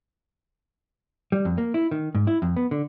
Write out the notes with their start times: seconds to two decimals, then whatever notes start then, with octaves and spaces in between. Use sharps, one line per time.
1.32 G3
1.45 F2
1.58 A#3
1.74 E4
1.91 D#3
2.15 G#2
2.27 E4
2.42 F2
2.56 B3
2.71 D3